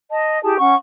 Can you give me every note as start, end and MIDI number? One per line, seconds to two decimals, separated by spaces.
0.12 0.39 75
0.12 0.39 81
0.43 0.57 64
0.43 0.57 67
0.43 0.57 68
0.43 0.57 81
0.58 0.75 61
0.58 0.75 78
0.58 0.75 85